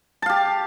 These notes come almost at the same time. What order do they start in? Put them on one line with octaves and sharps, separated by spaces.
A5 F5 G4